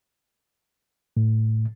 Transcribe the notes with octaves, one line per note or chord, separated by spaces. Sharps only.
A2